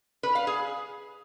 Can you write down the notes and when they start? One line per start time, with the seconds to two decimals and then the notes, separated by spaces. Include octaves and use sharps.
0.23 B4
0.35 F5
0.47 G#4